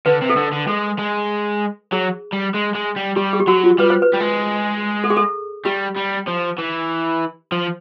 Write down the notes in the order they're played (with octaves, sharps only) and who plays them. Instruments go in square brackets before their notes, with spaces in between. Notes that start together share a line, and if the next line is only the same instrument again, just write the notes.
[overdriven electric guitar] D3 [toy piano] B4
[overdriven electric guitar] C3
[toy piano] A4
[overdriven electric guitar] D3 [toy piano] A#4
[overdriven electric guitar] D3
[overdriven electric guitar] G#3 [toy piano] A4
[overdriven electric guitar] G#3
[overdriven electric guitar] F#3 [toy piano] G#4
[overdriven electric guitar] G3
G#3
G#3
G3
[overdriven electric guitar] G3 [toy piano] G4
[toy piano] G#4
G4
[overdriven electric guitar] F#3 [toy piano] F#4
[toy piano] F4
[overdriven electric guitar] G3 [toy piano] B4
[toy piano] C5
B4
[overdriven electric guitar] G3
G#3
[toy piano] A4
G#4
A4
[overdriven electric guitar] G3 [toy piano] G4
[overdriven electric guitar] G3
F3
E3
F3